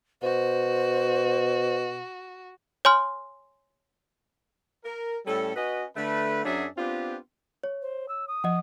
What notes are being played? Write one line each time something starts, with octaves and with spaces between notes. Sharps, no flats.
B2 F#4 C5
C#5 G#5 C6 F6
A#4
A2 G3 C#4 A4
C#4 F#4 B4 D#5
D3 A3 B4
F#2 F#3 C#4 D4 G#4 E5
B3 C4 D4 F4 G4
C#5
C5
E6
D#6
F3 D#5 F#5